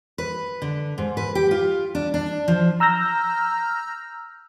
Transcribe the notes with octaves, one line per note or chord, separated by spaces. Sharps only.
B4
D3
G#2
B4
G4
F4
D4
D4
F3
A#5 E6 F6 G6 A#6